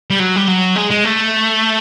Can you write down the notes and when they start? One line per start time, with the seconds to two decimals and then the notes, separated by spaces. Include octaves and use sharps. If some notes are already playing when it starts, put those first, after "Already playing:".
0.10 G3
0.20 F#3
0.36 G3
0.48 F#3
0.76 G#3
0.90 G#3
1.04 A3